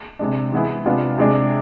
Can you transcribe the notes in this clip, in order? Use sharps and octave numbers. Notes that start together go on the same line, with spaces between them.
C3 G#3 D4
E3 G#3 B3 E4 G#4
C3 G#3 B3 D4 F4
C3 G#3 D4 G#4